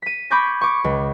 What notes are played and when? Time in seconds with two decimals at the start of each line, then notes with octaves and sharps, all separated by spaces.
0.02 B6 D#7
0.30 B5 C#6 D6 G6 G#6 A#6
0.61 C#6 D6
0.84 C#2